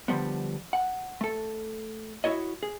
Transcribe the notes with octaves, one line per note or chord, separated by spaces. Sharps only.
D3 F3 G3 B3
F#5
A3 A4
E4 F#4 C#5 D#5
G#4